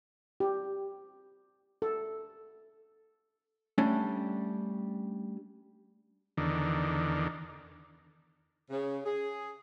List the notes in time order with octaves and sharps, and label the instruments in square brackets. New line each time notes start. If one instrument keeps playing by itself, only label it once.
[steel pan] G4
A4
[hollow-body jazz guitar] G3 A3 C#4 D4
[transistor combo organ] E2 D3 D#3
[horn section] C#3
G#4